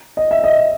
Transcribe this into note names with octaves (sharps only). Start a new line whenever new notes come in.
D#5
E5
D#5